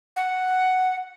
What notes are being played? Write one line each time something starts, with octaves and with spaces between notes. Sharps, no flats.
F#5